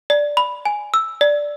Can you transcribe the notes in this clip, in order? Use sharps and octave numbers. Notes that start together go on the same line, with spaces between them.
D5
B5
G#5
E6
D5